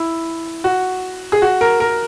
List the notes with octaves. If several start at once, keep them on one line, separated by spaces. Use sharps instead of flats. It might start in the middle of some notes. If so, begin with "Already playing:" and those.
Already playing: E4
F#4
G#4
F#4
A#4
A#4